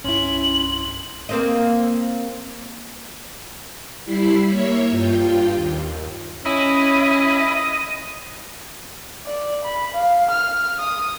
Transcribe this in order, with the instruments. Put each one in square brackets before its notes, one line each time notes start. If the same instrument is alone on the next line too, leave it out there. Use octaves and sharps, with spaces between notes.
[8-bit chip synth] C2 G2 C6 [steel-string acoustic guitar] C#4 E4 [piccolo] F#7
[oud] A#3 C4 D#5
[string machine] G3 E4 B5 C7
A#3 C#5 E5
G2 F4 G5
D#2
[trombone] C#4 [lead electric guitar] E4 [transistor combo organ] D#5
[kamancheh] D5
B5
F5
F6
D#6